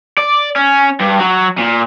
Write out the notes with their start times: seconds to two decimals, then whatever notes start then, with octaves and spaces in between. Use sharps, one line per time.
0.18 D5
0.56 C#4
1.00 G2
1.19 F#3
1.58 A#2